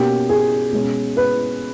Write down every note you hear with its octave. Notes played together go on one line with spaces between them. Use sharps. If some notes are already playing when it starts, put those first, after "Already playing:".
Already playing: B2 A#3 C#4 G4
G#4
B2 G#3 C#4
B4